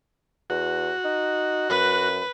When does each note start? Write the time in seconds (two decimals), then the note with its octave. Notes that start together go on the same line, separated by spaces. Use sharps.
0.50 E2 F#4
1.04 D#4
1.70 F#2 B4